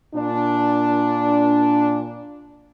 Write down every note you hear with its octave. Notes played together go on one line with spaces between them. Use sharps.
A#2 D4